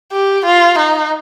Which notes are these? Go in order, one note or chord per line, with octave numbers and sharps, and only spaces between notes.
G4
F4
D#4